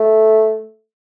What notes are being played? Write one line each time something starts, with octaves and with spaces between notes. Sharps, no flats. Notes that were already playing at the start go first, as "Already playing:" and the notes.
Already playing: A3